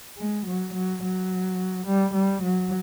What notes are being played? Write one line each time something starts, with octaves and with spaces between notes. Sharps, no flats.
G#3
F#3
F#3
F#3
G3
G3
F#3